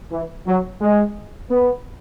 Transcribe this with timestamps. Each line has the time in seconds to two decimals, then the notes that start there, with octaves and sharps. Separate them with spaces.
0.12 E3
0.47 F#3
0.81 G#3
1.51 B3